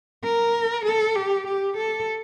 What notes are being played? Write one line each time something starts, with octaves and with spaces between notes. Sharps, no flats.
A#4
A4
G4
G4
A4